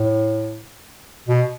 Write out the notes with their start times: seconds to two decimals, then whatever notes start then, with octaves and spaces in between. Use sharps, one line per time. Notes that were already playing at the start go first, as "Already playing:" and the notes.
Already playing: A2
1.28 B2